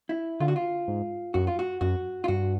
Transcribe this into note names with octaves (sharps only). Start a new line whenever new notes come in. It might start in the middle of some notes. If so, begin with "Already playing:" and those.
E4
D3 F4
F#4
F4
G#2
F#2 F#4
F4
F#4
F#2 F#4
F4
G2 F#4